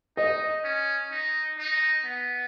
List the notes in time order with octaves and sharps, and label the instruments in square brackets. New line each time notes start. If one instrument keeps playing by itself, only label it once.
[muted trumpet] D#4 [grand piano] D#5
[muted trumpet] C#4
D#4
D#4
B3